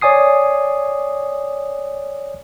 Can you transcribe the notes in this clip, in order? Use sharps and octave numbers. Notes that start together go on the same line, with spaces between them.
C#5 D5 G#5 D#6 C7